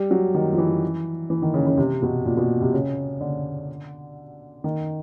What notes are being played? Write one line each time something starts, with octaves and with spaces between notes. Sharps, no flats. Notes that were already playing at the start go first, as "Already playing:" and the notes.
Already playing: G3
F#3
D#3
F3
E3
E3
D#3
C#3
C#3
C3
B2
A#2
B2
C3
C#3
D3
D#3